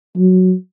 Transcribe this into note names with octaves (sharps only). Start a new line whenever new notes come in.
F#3